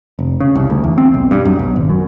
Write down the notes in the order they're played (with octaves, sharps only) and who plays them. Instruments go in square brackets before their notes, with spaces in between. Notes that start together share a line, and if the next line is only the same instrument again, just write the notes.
[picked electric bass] F1
C#3
C2
D2
E2
C4
B1
G2
F#2
B1
G#1
F#2